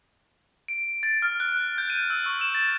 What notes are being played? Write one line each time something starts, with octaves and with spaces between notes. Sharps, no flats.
D7
A6
F6
F#6
G6
D#7
E6
C#6
E7
A6